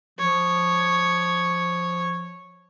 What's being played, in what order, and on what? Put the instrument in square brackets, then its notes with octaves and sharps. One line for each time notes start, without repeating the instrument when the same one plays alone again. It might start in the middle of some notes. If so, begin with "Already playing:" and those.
[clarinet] F3 [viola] C#5